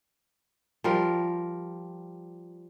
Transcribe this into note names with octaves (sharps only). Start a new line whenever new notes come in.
F3 G3 A#4